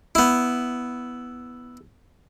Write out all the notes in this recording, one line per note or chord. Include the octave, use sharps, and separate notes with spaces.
B3 E4